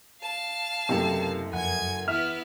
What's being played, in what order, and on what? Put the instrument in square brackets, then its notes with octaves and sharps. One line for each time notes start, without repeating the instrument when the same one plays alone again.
[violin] F5 A5
[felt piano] F#1 F#2 A3 [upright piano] C3
[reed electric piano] F2 [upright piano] F#5 [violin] G#5 G#6
[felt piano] E2 [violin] B3 E4 [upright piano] E5 [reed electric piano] F6